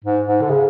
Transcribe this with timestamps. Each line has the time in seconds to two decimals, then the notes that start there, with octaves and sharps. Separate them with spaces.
0.04 G#2
0.26 G#2
0.41 D3
0.50 C#3